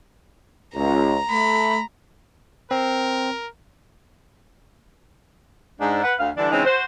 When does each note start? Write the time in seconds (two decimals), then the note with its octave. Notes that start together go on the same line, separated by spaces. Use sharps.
0.74 C#2 A#5
1.30 A3 B5
2.71 C4 A#4
5.80 G#2 D4
6.03 B4 F#5
6.19 D2 F5
6.36 D3 E3 G3 D4
6.52 C#3 E3 G#3 C4 C#4 D#4
6.65 F#4 C5